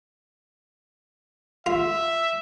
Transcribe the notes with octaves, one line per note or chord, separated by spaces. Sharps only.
F4 E5